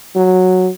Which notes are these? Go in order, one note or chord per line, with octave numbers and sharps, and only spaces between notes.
F#3